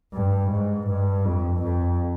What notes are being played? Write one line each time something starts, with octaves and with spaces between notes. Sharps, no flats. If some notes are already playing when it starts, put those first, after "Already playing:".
G2
G#2
G2
F2
F2